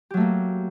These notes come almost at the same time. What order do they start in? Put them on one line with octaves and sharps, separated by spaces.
G4 F#3 A3 A#3